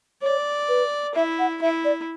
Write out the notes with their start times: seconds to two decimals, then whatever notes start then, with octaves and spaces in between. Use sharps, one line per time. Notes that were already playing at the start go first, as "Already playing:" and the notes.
0.22 C#5 D5
0.69 B4
1.15 E4 E5
1.39 F#5
1.62 E4 E5
1.85 D5